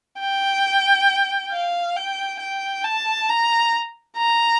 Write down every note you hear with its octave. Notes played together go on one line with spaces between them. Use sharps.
G5
F5
G5
G5
A5
A#5
A#5